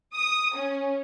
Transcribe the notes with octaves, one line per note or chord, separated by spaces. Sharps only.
D#6
C#4